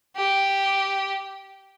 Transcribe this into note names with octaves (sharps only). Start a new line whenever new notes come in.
G4